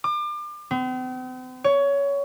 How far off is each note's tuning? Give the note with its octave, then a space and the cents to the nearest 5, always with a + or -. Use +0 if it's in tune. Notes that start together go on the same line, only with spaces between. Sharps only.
D6 +35
C4 -45
C#5 +20